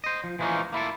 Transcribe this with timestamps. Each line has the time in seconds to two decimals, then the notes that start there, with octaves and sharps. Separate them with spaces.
0.04 C5 D#5
0.24 F3
0.39 E3 F3 G#3 A#3 C#4 D#4
0.73 A#3 E4 F4 A4